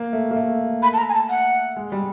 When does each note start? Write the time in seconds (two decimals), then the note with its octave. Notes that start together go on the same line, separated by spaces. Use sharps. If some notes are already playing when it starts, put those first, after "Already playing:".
Already playing: A#3
0.13 A3
0.31 A#3
0.36 A3
0.83 B5
0.93 A5
0.98 A#5
1.09 G#5
1.14 A5
1.30 F#5
1.76 G#3
1.92 G3